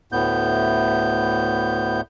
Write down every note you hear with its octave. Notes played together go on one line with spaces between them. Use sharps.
D2 A2 B3 G6